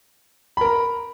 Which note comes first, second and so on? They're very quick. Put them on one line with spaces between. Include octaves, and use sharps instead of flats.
B5 A#4 A#5